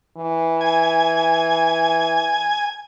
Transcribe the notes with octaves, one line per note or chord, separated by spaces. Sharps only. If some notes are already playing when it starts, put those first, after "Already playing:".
E3
G#5